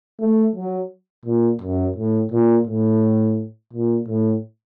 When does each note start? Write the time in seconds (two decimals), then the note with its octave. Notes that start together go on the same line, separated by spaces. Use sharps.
0.20 A3
0.55 F#3
1.25 A#2
1.62 F#2
1.97 A2
2.32 A#2
2.67 A2
3.73 A#2
4.09 A2